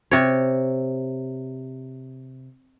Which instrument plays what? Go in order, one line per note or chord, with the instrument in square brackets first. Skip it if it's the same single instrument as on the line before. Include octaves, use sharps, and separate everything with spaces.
[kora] C3 C#5